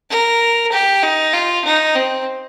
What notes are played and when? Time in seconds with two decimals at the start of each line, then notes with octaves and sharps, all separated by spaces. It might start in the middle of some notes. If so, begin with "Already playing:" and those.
0.11 A#4
0.73 G4
1.03 D#4
1.34 F4
1.65 D#4
1.96 C4